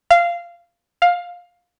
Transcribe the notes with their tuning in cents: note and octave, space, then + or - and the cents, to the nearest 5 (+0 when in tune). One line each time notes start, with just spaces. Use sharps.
F5 -15
F5 +15